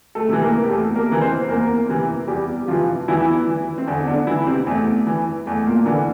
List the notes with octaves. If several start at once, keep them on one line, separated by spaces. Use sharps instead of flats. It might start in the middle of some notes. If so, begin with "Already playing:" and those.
A3 A4
C3 E3
A#3 A#4
G4
E2 A3 A4
A#3 A#4
C3 E3
C4 C5
E2 A#3 A#4
C3 E3
E2 G3 G4
C3 E3 F3 F4
E2 E3 E4
E3
C4
E2 D3 D4
D3 D4
E3 E4
C3 C4
E2 A3
E3
E2 A3
A#2 A#3
D3 E3 D4